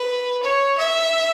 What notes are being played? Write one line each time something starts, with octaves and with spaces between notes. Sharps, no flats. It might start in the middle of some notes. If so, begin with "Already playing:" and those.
Already playing: B4
C#5
E5